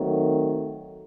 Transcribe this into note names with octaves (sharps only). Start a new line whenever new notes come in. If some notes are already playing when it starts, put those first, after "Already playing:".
Already playing: D#3 F#3 A3 C4